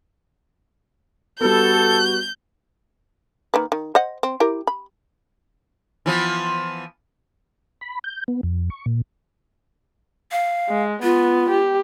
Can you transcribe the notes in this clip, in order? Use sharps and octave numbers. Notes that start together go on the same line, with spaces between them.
G3 B3 F#4 A4 G6
D#3 A#3 B4
D#3
C5 D#5 F#5
C4
E4 G4 A#4
B5
E3 F3 B3
B5
G6
B3
F2
C#6
A#2
F5
G#3
B3 F4
G4